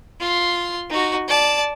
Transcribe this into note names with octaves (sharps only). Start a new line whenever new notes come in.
F4 C6
D#4 F#4
D5 A5